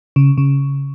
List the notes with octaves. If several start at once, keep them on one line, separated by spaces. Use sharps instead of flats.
C#3
C#3